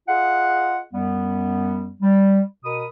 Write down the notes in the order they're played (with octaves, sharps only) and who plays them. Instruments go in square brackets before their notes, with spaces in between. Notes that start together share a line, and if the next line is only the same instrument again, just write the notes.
[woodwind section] F4 G#4 D#5 F5 F#5
F#2 G3 B3
G3
B2 A#4 B5 D#6